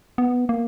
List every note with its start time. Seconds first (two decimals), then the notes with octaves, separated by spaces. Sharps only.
0.18 B3
0.49 A#3